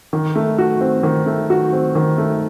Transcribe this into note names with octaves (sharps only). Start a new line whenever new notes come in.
D#3
A3
F#4
C4
D#3
A3
F#4
C4
D#3
A3